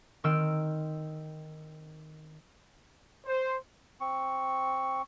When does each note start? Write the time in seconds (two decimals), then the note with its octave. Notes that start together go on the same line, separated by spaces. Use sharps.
0.24 D#3 C4 G5 E6 F6 D7
3.25 C5
4.00 C4 C#6